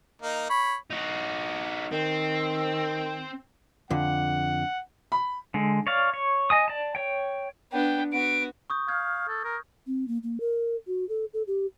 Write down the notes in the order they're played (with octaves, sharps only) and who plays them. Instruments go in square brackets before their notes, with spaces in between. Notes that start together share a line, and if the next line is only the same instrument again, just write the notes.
[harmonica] A#3 D#4
C#5 B5
[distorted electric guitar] D#4 F#4
[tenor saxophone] D#3 [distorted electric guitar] C4
[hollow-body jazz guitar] F2 D3 [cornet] F#5
[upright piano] B5
[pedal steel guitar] D3 G#3
C#5 D5 F5
C#5
D#5 G#5 D#6
D5 A5
C#5 G5
[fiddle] B3 D4 [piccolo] G5
[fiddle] B3 F#4 [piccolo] D7
[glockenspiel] C#6 D#6 G6
[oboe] F5 [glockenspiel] F6 G6 G#6
[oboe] A4
A#4
[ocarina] C4
A#3
A#3
A#4
F#4
A4
A4
G4